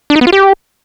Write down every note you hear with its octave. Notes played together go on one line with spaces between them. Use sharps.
D4
D#4
B3
F4
G4